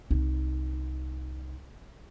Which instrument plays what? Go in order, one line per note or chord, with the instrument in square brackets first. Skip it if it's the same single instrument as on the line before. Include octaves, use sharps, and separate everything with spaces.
[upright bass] C2 D#4